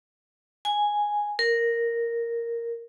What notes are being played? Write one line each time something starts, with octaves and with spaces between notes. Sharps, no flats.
G#5
A#4